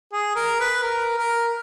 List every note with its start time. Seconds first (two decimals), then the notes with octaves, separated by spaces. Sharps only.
0.13 G#4
0.36 A#4
0.60 B4
0.83 A#4
1.18 A#4